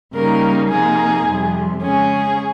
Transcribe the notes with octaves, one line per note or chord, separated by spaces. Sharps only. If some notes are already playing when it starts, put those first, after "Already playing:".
C#3 G3 A#3 D#4 A#4
C3 F3 A#3 D#4 G#4
F2 C3 G3
C#3 G#3 C#4 G#4